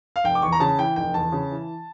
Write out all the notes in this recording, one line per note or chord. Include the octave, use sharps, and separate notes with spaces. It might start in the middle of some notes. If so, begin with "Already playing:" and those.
F5
F1 G5
D6
E2 C#6
A#5
C#3 A5
E3 G5
F1 G5
E2 A5
C#3
E3